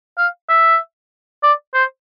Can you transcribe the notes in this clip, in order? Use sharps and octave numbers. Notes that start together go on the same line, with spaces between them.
F5
E5
D5
C5